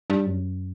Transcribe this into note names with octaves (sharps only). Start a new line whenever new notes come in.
G2
F#2